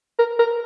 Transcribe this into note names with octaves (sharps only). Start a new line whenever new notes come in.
A#4
A#4